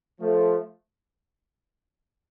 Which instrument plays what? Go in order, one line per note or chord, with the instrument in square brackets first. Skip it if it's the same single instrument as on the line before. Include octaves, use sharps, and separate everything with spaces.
[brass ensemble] F3 A3